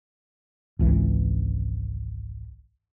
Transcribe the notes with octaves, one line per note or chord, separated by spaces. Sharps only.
G#1 C#2 E3